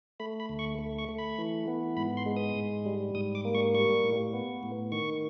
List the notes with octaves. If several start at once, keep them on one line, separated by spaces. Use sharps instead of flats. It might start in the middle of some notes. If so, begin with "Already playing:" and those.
A3 B5
B5
D2
C#6
A3
C#6
A3
B5
E3
B3
G#2 B5
C6
G#3
D#6
G#2
G3
G#2 D#6
D6
A#3
C#6
G3 C#6
A2
B3
A2
D#3 C#6